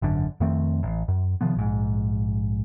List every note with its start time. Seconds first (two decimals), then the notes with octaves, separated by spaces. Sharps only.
0.02 G#1 F#2 D3
0.40 F2 D#3 A3 C4
0.83 A1
1.08 F#2
1.41 C3 D#3 F3 B3
1.55 A#1 G#2